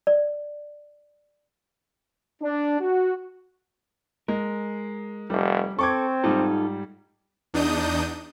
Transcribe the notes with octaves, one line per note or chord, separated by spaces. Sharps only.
D5
D4
F#4
G#3 A#4
F1 G3
C4 A4 C#6 D6 G#6
G#2 G3 D#4 F4 A4
E2 D4 D#4 D#6 G6